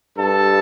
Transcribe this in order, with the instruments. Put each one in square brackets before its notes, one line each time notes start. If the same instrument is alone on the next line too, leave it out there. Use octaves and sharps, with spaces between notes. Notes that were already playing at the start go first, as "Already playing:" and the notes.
[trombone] G2 [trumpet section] A4 A5